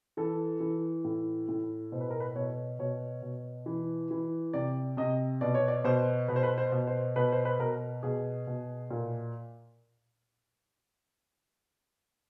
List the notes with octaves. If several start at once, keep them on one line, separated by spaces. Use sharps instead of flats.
E3 A4
E3
A2
A2
B2 C5
B4
A#4
B4
B2 C#5
B2 C#5
B2
E3
E3
C3 D5
C3 D#5
B2 D5
C#5
D5
B2 C5
B2 B4
C5
B4
C5
B2
C5
B2 B4
C5
B4
B2 A#4
B2 G#4
B2
A#2